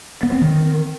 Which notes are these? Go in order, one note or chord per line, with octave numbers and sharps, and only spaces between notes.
B3
C4
D#3